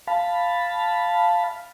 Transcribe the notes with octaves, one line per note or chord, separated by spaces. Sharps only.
F5 A5 B5